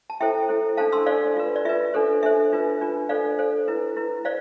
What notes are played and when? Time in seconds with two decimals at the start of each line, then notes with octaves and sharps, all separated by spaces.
0.10 A5
0.20 E4 A4 C5 E5 G5
0.49 E4 A4 C5
0.77 D4 A4 C5 F5 A5
0.92 C6 E6
1.06 D4 A4 C5 D5 F5
1.36 F4 B4
1.56 D5
1.65 F4 B4 E5
1.94 D4 A4 C5
2.23 D4 A4 C5 E5
2.52 D4 F4 B4
2.81 D4 F4 B4
3.09 D4 A4 C5 D5 F5
3.39 D4 A4 C5
3.68 E4 B4
3.97 E4 B4
4.25 C5 D5 F5